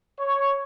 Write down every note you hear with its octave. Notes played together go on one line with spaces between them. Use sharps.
C#5